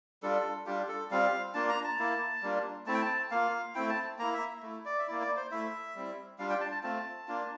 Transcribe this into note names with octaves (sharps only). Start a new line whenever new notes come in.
G3 D4 F4 A4
G3 D4 F4 G4
A4
G3 C4 F4 F5
A#3 D4 F4 A5
A#5
A5
A#3 E4
G3 A#3 D4 F4
A3 C4 E4 A5
G5
A5
A#3 F4 F5
A3 C4 E4 G5
A5
A#3 E4 A#5
E5
A3 E4
D5
E5
A#3 E4 D5
D5
C5
A3 E4 E5
G3 C4 E4
G3 D4 F4 F5
G5
A5
A5
A3 C4 F4 A5
A#3 D4 F4